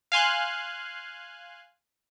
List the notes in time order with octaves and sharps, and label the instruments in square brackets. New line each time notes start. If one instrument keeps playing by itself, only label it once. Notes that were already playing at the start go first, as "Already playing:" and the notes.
[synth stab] F5 G#5 C6 F#6